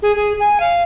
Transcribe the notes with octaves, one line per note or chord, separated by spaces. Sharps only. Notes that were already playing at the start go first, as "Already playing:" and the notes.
G#4
G#4
G#5
F5